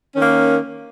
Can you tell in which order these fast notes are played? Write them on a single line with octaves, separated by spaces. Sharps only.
C#4 D#3 A#3